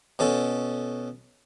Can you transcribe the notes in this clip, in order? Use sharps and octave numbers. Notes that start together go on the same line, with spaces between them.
B2 C#4 A4